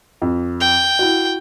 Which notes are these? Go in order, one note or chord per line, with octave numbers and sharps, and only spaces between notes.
F2
G5
E4 F#4